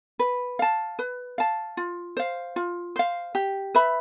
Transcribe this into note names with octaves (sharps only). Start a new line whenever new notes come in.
B4
F5 A5
B4
F5 A5
F4
C5 F5
F4
C5 F5
G4
B4 E5 B5